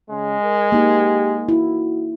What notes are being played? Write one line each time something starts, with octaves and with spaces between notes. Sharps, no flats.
C#3 G#3
A#4
A#3 D#4 G4
E4 F#4